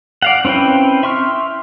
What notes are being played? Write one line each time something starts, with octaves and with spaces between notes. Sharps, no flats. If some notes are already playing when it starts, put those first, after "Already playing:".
D5 F5 F#5
C4 C#4 E4 B4 G5
E5 C6 C#6 F6